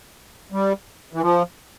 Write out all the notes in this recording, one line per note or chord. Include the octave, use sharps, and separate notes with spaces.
G3
E3
F3